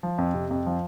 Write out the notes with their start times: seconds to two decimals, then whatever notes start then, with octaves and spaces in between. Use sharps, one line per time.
0.03 F3
0.18 F2
0.34 C3
0.51 F2
0.66 F3